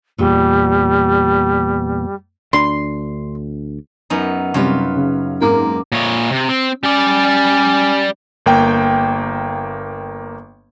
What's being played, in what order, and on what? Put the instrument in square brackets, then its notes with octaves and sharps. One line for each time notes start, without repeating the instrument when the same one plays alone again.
[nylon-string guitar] E2 A#2 [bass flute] G3
[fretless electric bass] D2 D4 [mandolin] C6
[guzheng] F#2 B3 D#4
[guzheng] F#2 F4 B4 [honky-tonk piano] C3 G3
[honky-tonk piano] C#3
[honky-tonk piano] G#2 A#4 D6 [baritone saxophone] A#3
[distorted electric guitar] A#2 C#5
C3
C4
[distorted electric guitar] G3 D5 [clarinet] C#4
[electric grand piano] G1 A#3 G5